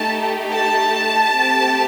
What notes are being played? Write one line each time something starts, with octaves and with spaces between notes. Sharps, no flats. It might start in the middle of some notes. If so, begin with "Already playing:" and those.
Already playing: A3 D#4 G4 A5
A5
A3 C4 G4